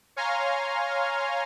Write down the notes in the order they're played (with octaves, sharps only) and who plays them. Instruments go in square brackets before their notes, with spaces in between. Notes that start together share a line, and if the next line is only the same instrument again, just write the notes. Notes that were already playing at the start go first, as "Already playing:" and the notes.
[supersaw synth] C#5 F5 G#5 A#5 C6 F6